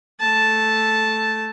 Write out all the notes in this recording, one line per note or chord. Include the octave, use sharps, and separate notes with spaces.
A3 A5